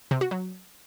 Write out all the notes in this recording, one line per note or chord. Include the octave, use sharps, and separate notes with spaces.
C3
F#4
F#3